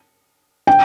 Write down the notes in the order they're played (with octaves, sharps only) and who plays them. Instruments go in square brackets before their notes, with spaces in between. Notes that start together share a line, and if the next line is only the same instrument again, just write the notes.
[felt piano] G5